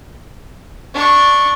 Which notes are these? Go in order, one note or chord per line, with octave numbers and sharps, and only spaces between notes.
D4 C#6